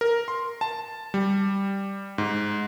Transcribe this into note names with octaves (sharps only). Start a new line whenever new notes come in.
A#4
C6
A5
G3
G#2